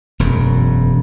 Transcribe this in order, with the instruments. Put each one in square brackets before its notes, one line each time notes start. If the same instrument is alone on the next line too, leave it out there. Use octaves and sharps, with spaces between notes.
[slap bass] E1 F#2